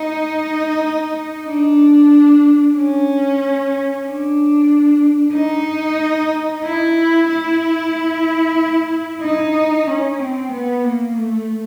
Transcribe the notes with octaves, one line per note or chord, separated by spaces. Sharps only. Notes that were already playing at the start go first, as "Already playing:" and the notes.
Already playing: D#4
D4
C#4
D4
D#4
E4
E4
D#4
C#4
C4
B3
A#3
A3